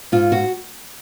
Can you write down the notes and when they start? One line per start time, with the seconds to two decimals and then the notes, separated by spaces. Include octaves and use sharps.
0.12 G#2 F4
0.32 F#4